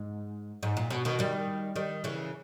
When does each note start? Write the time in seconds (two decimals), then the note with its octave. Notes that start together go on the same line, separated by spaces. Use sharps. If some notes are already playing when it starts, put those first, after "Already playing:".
Already playing: G#2
0.63 G#2
0.77 A#2
0.90 B2
1.05 B2 D#3
1.19 D#3 G3
1.76 D#3 G3
2.04 C#3 E3